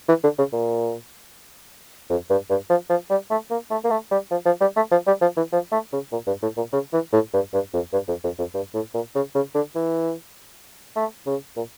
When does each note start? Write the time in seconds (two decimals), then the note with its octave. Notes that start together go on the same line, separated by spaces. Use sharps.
0.08 E3
0.23 D3
0.38 C#3
0.53 A#2
2.10 F2
2.30 G2
2.50 G2
2.70 F3
2.89 F3
3.10 G3
3.30 A3
3.50 A#3
3.71 A3
3.84 A#3
3.90 A3
4.11 G3
4.31 F3
4.46 F3
4.61 G3
4.76 A3
4.91 F3
5.07 G3
5.21 F3
5.37 E3
5.52 F3
5.72 A3
5.92 C#3
6.12 A#2
6.27 G2
6.42 A2
6.57 A#2
6.72 C#3
6.93 E3
7.13 A2
7.33 G2
7.53 G2
7.73 F2
7.93 G2
8.08 F2
8.24 F2
8.38 F2
8.54 G2
8.74 A2
8.94 A#2
9.15 C#3
9.35 C#3
9.55 D3
9.75 E3
10.96 A3
11.26 C#3
11.57 A#2